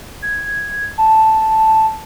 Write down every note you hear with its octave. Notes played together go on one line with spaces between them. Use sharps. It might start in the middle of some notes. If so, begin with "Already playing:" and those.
G#6
A5